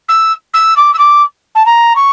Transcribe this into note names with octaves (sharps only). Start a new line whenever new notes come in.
E6
E6
D6
E6
D6
A5
A#5
C#6